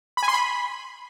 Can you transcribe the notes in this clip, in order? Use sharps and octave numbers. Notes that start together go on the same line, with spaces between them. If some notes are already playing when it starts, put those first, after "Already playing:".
B5
G#5
C6
B5